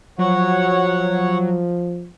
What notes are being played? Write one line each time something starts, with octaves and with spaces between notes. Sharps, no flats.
F3 F#3 C#5 F#5